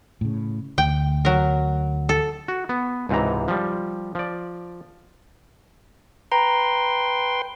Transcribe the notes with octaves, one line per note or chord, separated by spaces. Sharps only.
A2 C#3
D2 G5
F#3 A#4
A4
F#4
B3
C#2 G#2 C3 E3 A#5
F3 G3
F3 D5
B4 G5 A#5 C6